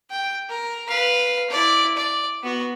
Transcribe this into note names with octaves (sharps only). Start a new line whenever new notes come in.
G5
A#4
B4 F5
E4 D5
D5
B3 F#4